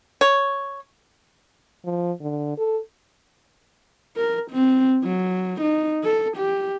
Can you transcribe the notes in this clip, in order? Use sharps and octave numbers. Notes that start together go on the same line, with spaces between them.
C#5
F3
D3
A4
A#4
C4
F#3
D#4
A4
G4